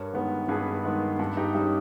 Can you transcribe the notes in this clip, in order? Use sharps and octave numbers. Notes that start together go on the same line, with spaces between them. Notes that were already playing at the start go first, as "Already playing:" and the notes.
Already playing: G2 A#4 C#5
D#3 G#3 B3
G2 G#4 B4
D#3 G#3 B3
G2
D#4 G4
G3 C#4 D#4